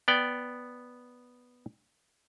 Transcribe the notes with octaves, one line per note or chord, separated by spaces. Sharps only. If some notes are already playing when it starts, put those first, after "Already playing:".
B3 D5 G5